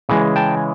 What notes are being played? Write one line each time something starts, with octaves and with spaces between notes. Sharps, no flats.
C#3 E3 G#3
G5 A5